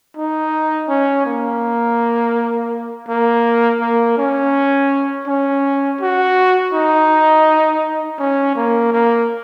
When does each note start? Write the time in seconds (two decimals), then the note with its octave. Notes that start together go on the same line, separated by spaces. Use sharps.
0.17 D#4
0.89 C#4
1.26 A#3
3.08 A#3
3.81 A#3
4.18 C#4
5.27 C#4
6.01 F#4
6.73 D#4
8.19 C#4
8.55 A#3
8.92 A#3